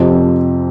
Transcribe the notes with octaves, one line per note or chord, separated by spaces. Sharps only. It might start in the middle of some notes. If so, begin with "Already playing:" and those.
Already playing: F2 C3 F3